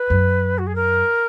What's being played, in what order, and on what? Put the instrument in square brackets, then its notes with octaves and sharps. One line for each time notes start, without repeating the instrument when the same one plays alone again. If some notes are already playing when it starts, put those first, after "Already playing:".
Already playing: [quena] B4
[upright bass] F#2
[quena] F#4
G#4
A#4